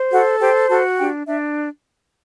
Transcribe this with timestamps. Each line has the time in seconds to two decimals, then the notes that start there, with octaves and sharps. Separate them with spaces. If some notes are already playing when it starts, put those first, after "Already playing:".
Already playing: C5
0.11 F#4 A4 F#5
0.40 G4 C5 G5
0.69 F#4 A4 A5
0.98 D4 G4 G5
1.26 D4 E5